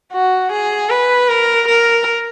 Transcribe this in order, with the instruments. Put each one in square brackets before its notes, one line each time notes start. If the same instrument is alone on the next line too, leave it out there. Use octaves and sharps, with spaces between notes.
[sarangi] F#4
G#4
B4
A#4
A#4